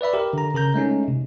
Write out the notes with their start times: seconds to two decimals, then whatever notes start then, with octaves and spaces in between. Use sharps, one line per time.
0.01 B4 D5 E5 B5
0.13 G4 A#4
0.33 D3 A#5
0.54 C#3 A#4 A#5 G6
0.74 G#3 A3 C#4 D#4
1.08 C3